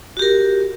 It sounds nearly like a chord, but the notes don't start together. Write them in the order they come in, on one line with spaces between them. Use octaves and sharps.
F#4 G4 A#4